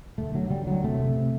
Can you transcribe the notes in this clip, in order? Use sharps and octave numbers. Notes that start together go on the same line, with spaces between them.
D2 A3
D3 F#3
D2 G3
D3 F#3
C3 A3
C3
C3